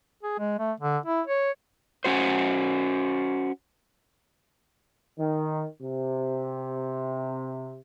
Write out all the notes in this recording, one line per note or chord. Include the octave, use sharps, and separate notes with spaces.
G#4
G#3
A3
D3
E4
C#5
C#4 F#4 C5
D#3
C3